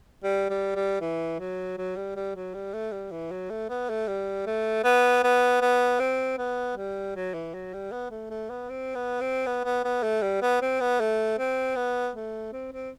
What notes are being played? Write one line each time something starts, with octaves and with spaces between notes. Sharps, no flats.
G3
G3
G3
E3
F#3
F#3
G3
G3
F#3
G3
A3
G3
E3
F#3
A3
B3
A3
G3
A3
B3
B3
B3
C4
B3
G3
F#3
E3
F#3
G3
B3
A3
A3
B3
C4
B3
C4
B3
B3
B3
A3
G3
B3
C4
B3
A3
C4
B3
A3
C4
C4